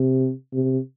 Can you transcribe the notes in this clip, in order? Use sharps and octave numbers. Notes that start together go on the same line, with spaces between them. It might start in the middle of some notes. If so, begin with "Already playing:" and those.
Already playing: C3
C3